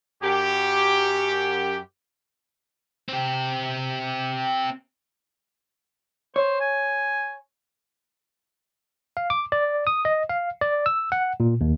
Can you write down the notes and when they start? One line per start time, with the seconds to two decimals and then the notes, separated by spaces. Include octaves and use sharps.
0.22 F#2 G4
3.08 C4 G4
6.36 C5 C#5
6.61 G#5
9.17 F5
9.30 D6
9.52 D5
9.87 D#6
10.05 D#5
10.29 F5
10.61 D5
10.86 E6
11.12 F#5
11.40 A#2
11.61 D#2